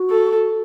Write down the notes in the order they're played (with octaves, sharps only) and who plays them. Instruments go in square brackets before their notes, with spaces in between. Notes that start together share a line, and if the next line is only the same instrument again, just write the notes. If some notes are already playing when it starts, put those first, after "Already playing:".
Already playing: [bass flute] F#4
[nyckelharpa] A4